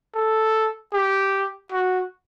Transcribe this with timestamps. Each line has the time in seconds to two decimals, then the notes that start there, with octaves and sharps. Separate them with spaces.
0.15 A4
0.93 G4
1.72 F#4